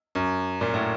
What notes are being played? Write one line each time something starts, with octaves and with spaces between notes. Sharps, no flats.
F#2
A#2
A2